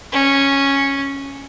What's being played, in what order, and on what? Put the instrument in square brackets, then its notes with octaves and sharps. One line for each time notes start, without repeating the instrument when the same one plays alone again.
[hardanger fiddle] C#4